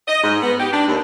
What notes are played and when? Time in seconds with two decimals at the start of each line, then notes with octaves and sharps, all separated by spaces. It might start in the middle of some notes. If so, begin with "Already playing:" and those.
0.08 D#5
0.23 G#2
0.42 B3
0.59 G4
0.73 D4
0.88 D#2